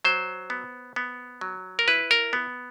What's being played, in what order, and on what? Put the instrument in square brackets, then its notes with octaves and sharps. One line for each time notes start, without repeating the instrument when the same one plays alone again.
[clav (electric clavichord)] F#3 C5
B3
B3
F#3
A#4
E4 B4
A#4
B3